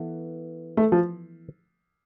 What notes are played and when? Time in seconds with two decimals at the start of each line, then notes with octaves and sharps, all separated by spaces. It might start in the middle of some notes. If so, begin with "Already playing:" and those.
Already playing: E3 B3 A4
0.77 A3
0.92 F3